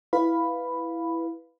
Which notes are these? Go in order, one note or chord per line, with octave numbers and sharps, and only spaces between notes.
E4 B4 F5 B5